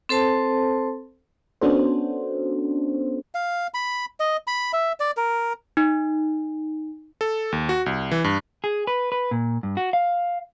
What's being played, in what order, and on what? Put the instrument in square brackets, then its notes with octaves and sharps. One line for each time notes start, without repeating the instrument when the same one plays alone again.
[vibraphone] C4 A4 C5 A5
[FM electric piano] B3 C#4 D4 F#4 A4 C5
[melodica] F5
B5
D#5
B5
E5
D5
A#4
[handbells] D#4
[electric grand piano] A4
D#2
F#4
C2
E3
G2
[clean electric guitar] G#4
B4
B4
A#2
G2
F#4
F5